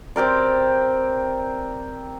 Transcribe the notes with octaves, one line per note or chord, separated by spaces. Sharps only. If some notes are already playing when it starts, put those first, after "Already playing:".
C4 G4 A#4 D5